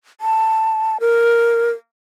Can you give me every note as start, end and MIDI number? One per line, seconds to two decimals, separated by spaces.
0.21 0.97 81
1.00 1.71 70